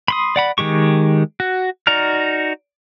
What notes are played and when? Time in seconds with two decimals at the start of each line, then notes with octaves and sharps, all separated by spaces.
0.08 B5 C6 D#6
0.36 D5 F#5 B5
0.58 D#3 G#3 G4 C#6
1.40 F#4
1.87 D#4 F#4 D5 A#5 F6